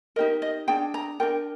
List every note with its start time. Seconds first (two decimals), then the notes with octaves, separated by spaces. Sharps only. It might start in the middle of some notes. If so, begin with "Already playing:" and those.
0.16 D#4 G4 A#4 D#5
0.42 D#5
0.68 D4 G#4 G5
0.94 A#5
1.20 D4 F4 A#4 G5